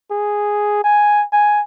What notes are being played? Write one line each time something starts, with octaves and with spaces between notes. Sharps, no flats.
G#4
G#5
G#5